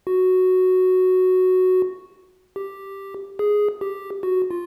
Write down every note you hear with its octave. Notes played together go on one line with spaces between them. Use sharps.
F#4
G4
G#4
G4
F#4
F4